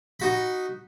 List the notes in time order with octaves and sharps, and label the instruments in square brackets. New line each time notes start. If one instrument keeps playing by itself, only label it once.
[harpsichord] D#4 F#4 B5